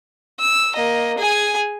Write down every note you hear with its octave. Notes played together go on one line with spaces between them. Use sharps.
E6
A#3 D#5
G#4 G#5